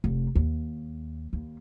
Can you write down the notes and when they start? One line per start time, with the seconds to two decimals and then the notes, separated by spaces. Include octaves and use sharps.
0.04 F1
0.35 D#2
1.33 D#2